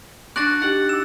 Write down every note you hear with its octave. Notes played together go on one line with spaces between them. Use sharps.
D4 F#4 D5 F#6 A6
D#4 G4 F#5
D6 E6 E7